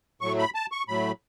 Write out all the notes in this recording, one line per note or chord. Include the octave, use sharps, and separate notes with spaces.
A2 F#3 A3 C#6
B5
A5
C#6
A2 F#3 A3 B5